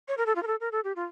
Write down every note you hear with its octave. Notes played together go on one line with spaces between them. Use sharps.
C#5
A#4
A4
F4
A#4
A4
A#4
A4
G4
F4